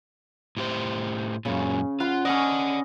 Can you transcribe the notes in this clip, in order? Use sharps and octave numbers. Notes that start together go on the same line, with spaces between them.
A2 G4 C5
F#2 A#2 C#3
F4 F#5 B5
C#4 D5 D#5 F#5